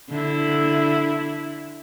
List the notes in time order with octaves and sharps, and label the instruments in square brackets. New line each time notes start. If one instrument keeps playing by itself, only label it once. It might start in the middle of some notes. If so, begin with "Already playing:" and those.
[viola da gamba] D3 E4